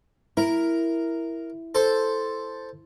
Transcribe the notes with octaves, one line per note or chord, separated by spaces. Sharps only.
E4 A#4
A4 C5